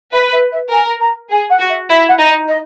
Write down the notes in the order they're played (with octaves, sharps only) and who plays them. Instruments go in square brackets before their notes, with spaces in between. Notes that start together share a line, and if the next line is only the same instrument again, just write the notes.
[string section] B4 [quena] E5
[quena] E5
E5
[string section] A#4 [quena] G#5
[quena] A#5
[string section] G#4 [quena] G#5
[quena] F#5
[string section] F#4
[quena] E5
[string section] E4
[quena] F#5
[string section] D#4
[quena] D#5
D#5